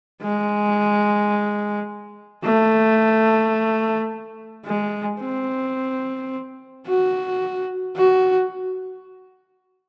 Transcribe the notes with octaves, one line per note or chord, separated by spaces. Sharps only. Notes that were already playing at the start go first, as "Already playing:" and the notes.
G#3
A3
G#3
C4
F#4
F#4